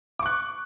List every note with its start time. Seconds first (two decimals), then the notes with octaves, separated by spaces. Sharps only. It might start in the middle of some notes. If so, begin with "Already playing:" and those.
0.19 D6
0.23 C#6
0.26 F#6